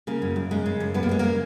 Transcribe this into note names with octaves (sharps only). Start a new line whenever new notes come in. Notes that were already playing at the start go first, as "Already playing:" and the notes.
C#3 A#3
F#2
F#2
C#3 G#3
C#3
F#2
F#2 B3
A#3
C#3 G#3
C#3 A#3